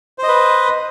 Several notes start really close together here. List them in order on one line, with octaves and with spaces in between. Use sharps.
C5 D#5 B4